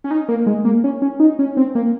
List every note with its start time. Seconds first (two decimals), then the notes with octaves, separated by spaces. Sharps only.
0.04 C#4
0.11 D#4
0.29 A#3
0.47 G#3
0.65 A#3
0.84 C#4
1.02 C#4
1.20 D#4
1.39 C#4
1.57 C4
1.75 A#3